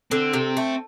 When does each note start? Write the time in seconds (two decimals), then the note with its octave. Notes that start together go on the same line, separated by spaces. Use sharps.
0.11 D3 C4
0.33 C3
0.57 A3